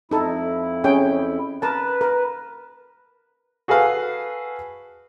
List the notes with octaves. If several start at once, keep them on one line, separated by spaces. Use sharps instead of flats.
F2 D#4 E4 A4
C#4 G#4 G5
A#4 B4 A5
A#4
F#4 G#4 A4 B4 F5